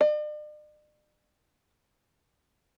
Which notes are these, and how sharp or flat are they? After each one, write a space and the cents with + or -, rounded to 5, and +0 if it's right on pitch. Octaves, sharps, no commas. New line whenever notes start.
D5 +45